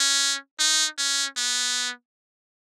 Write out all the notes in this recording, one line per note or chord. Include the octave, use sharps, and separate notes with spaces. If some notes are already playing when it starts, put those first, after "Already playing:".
Already playing: C#4
D#4
C#4
B3